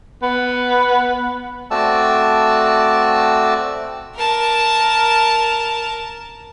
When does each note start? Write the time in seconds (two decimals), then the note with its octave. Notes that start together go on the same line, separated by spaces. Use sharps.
0.23 B3
1.71 A3 C4 F#4 D5 A5 E6
4.16 A#4 A5